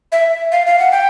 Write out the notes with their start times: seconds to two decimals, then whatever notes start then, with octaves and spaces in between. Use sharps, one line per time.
0.12 E5
0.52 F5
0.67 F5
0.79 F#5
0.92 G5